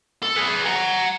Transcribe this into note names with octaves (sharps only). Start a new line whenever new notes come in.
A4
G#4 B4
F#5 A#5